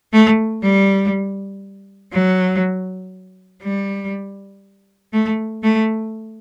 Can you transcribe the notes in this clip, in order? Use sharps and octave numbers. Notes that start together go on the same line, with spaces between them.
A3
G3
F#3
G3
A3
A3